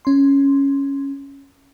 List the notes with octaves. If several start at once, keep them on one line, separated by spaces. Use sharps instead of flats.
C#4 C6